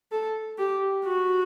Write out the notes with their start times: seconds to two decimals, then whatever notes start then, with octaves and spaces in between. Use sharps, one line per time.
0.12 A4
0.58 G4
1.05 F#4